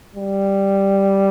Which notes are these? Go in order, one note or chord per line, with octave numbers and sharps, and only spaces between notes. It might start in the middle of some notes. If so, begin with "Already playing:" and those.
G3